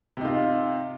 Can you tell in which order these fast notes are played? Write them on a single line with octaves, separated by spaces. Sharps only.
C3 D#4 F4